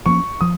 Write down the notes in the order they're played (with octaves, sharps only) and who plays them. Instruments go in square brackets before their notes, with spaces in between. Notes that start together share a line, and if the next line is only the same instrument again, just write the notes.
[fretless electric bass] F3 A#3 C#4 [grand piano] C#6
[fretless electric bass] F3 [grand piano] D#6